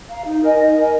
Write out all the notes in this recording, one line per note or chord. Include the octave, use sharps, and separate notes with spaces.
F5 A#5
D#4
A#4 D#5 G#5
D#4
A#4 D#5 G#5